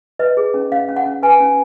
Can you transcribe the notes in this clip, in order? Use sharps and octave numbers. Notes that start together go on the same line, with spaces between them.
B4 D#5
G#4
C#4
C#4 F5
C#4
F#5
C#4
B4 G#5
C#4